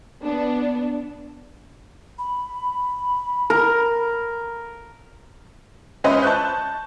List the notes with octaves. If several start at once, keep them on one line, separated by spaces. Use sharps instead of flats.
B3 D4
B5
A#4
G#3 C#4 B4 C5 D#5 E5
A5 C#6 F#6 G6